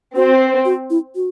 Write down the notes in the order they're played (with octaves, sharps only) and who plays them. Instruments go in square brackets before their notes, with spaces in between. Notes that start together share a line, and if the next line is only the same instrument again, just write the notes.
[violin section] C4 [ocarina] F#4
[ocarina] F#4
E4
F#4